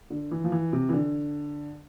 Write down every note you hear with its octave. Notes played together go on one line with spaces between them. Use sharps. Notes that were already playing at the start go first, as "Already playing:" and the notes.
D3
E3
F3
E3
C3
E3
D3